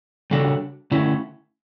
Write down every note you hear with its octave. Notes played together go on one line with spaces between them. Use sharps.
C#3 G3 D4 F#4 A4
D3 A3 C#4 E4